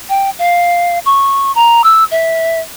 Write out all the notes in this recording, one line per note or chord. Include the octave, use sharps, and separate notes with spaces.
G5
F5
C#6
A#5
E6
E5